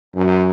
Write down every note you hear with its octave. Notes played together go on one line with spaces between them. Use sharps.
F#2